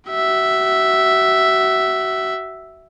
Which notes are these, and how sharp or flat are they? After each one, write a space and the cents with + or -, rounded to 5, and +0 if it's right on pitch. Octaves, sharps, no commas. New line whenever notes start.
F#4 +35 E5 +0